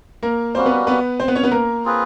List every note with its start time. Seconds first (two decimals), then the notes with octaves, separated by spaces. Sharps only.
0.23 A#3 A#4
0.55 G3 A#3 C4 C#4 F#4 C5
0.66 B3 B4
0.87 B3 B4
1.20 C4 C5
1.28 B3 B4
1.35 C#4 C#5
1.43 B3 B4
1.52 A#3 A#4
1.85 C4 F4 G#4 B4